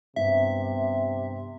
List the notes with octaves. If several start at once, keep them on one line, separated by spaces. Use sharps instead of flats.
G2 C3 B3 E5